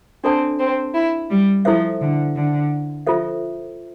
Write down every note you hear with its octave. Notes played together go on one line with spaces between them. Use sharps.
C4 D4 A4 D5 A5
C4
E4
G3
F3 E4 A4 C5 E5
D3
D3
F3 F4 A4 C5 E5